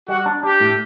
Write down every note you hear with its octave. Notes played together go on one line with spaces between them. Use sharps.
G3 F#4
D4
D4 G4
A2